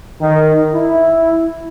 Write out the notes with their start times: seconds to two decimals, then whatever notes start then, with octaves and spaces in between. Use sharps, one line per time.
0.21 D#3
0.73 E4